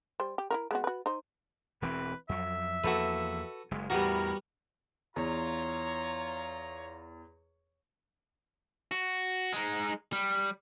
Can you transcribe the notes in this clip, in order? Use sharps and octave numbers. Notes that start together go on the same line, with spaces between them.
G3 C5
G4
E4 F#4 A#4
G#3 B3 F#4
F#4 B4
D#4 C5
E1 E3 C4 B4
F2 F#3 E5
E2 F3 A#3 F#4 A4 B4
F#1 G#3
E2 A2 E3 G3 B3 F#4 A#4
E2 F4 C#5 A#5
F#4
G#3 D#4
G3